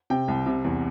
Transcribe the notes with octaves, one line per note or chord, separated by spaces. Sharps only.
C3 G5
C2
C3
E2